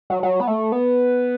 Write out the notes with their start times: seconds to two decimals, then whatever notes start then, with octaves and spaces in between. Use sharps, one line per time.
0.10 F#3
0.23 F#3
0.40 B3
0.47 A3
0.72 B3